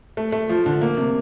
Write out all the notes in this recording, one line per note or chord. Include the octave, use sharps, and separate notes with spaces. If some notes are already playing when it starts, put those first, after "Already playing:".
A3
A3
F3
D3
A#3
C3